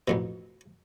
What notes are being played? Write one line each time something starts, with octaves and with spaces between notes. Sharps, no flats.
A1 F2 B2